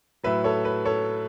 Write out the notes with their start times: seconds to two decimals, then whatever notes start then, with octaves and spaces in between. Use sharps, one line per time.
0.23 A2 F#3 B4 E5
0.44 A4 C#5
0.65 B4
0.85 A4 C#5